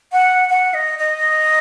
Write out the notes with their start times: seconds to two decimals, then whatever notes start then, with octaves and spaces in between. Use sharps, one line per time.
0.12 F#5
0.49 F#5
0.74 D#5
0.99 D#5